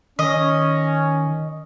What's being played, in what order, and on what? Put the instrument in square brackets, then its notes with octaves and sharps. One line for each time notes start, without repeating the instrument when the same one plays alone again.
[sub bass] D#3 [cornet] C#4 [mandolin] D#5